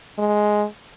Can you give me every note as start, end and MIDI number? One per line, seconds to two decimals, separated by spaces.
0.19 0.65 56